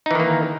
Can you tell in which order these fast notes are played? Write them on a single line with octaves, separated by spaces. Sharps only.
D#4 E3 D#3 A#3